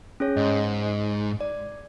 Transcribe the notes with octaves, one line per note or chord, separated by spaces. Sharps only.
C#4 G#4 C#5
G#2 D#5
D5